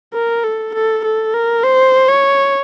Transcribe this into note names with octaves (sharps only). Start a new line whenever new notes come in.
A#4
A4
A4
A4
A#4
C5
C#5